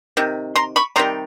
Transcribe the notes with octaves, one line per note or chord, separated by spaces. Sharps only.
C3 D#3
A#5 C6
B5 C#6
C3 D#3 G3 A#5 C6